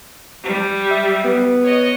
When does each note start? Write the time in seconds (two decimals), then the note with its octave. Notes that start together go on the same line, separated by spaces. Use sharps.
0.44 G3
0.91 E5
1.24 B3
1.63 C#5 D#5